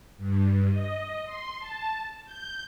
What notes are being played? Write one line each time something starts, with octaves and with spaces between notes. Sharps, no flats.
G2
D#5
C6
A5
G6